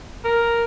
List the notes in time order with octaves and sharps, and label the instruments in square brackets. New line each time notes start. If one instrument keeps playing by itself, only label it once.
[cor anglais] A#4